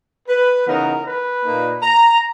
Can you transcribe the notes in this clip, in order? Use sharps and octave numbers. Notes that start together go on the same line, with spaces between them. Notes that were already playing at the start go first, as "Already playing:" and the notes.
B4
C#3 E3 B3 D#4 A#4
B4
A#2 A#3 D#4
A#5